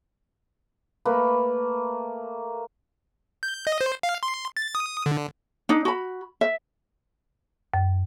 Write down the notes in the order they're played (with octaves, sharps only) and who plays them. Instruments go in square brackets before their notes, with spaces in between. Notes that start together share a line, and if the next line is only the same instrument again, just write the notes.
[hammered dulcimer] A3 A#3 B4
[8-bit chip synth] G6
D#5
C5
F5
C6
A6
D#6
D3
[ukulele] D4 D#4
F#4 B5
E5
[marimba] F#2